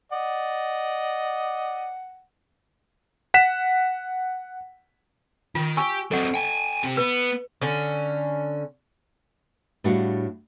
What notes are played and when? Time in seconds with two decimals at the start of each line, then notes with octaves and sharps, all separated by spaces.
0.12 D5 D#5 F#5
3.34 F#5 B6 E7
5.55 D#3 F4
5.77 G4 G#5 C#6 E6
6.11 F#3 C4 A4 D#5 F#5
6.34 G5 G#5
6.83 C3 G4
6.97 B3 B4
7.62 D3 C#4
9.84 A2 G3 D4 F#4 F5 F#5